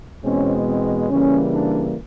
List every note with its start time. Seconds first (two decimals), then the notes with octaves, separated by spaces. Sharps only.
0.23 E2 B2 G#3 C4 C#4
0.67 C4
1.09 C#3 E3 G3 A#3 C#4
1.52 D4